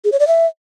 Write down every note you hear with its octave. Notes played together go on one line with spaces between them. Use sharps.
G#4
C#5
D5
E5